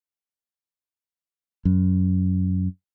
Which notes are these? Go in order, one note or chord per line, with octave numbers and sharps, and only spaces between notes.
F#2